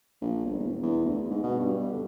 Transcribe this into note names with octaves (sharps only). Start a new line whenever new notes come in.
A#1
G1
E1
E2
D2
G#2
B2
G2
D3